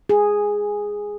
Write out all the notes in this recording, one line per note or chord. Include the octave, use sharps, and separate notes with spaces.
G#4